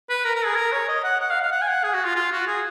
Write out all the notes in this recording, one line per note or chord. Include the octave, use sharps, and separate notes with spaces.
B4
A#4
A#4
G#4
A#4
C#5
D#5
F#5
F#5
F5
F5
F#5
G#5
F#5
G#4
F#4
F4
F4
F#4
G#4